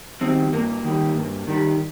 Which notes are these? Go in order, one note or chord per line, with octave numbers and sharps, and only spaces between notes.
D#3 G3 C4
G2 A#3
D#3 G3
G2
D#3 G3